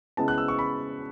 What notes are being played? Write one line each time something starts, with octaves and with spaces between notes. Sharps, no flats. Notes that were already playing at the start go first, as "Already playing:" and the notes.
C#3 G#3 B3 E4 A5
F#6
E6
C#6
B5